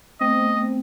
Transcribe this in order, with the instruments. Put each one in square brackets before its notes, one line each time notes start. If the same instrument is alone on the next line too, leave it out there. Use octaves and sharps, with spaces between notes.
[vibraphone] A3 B3 [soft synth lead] C4 [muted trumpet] D#5